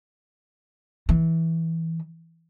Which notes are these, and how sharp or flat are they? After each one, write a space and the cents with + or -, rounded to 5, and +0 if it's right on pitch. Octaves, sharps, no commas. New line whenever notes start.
E3 -10